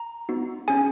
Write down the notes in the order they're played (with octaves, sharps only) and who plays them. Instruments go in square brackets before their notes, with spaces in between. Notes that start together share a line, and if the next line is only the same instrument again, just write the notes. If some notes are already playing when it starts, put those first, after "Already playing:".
Already playing: [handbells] A#5
B3 D#4 F#4
C#4 G#4 G#5